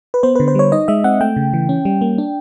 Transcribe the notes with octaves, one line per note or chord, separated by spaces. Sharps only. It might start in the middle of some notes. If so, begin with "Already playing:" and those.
B4
B3 C5
D3 B4
C5
G3 C#5
D#4 D#5
G#3 E5
C4 F#5
A3 G5
C#3
E3
C#4
G3
A#3
D4